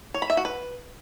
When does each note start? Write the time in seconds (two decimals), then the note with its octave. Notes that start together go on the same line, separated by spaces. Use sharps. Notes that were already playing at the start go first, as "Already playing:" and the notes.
0.14 C#5
0.22 B5
0.30 E5
0.37 F#4
0.45 B4